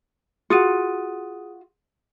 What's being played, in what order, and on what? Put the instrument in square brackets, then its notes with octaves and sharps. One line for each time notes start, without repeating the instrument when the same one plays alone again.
[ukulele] F4 F#4 [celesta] G#4 D#6 D#7